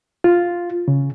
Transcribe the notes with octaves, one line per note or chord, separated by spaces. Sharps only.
F4
C#3